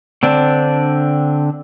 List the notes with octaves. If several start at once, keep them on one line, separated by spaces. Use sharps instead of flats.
D3 C4 D4